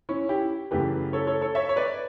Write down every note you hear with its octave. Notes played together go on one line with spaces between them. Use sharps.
C#4 E4
E4 G4
F#2 C#3 E3 A3 G4 B4
A4 C#5
A4 C#5
A4 C#5
C#5 E5
C#5
B4 D5